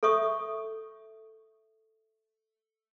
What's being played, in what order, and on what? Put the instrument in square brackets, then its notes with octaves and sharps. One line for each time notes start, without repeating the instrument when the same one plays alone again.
[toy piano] A4 C#5 E5 C#6 D#6